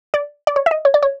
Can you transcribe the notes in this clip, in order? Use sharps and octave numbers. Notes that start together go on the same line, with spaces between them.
D5
D5
C#5
E5
D#5
C#5
D5
C#5